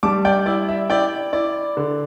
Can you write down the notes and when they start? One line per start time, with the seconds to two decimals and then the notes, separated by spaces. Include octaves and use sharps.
0.03 G3 A5 D6
0.25 D5 G5
0.46 E4 D5
0.69 E5
0.90 E4 D5 G5
1.33 E4 D5
1.77 D3